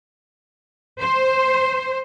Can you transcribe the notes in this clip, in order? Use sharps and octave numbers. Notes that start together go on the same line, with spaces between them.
C5